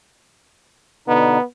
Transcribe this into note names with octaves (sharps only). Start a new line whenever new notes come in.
B2 D3 B3 D#4